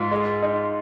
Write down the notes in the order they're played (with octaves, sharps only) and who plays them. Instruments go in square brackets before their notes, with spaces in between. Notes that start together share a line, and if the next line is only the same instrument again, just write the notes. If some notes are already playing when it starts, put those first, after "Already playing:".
Already playing: [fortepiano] G#2 [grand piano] F4
[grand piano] G#3
D#4